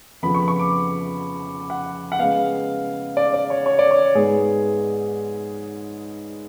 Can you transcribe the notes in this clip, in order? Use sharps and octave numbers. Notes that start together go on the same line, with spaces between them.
F2 C#3 F3 B3 B5
C#6
C#6
D6
F#5
F#5
C#3 G#3 B3 F5
D5
D5
C#5
C#5
D5
C#5
G#2 G#3 B3 G#4